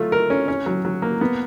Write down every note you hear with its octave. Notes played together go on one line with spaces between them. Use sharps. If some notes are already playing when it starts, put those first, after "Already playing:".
Already playing: F#3 A3 F4
A#4
C#4
C#4
F#3
F#3
A#3
B3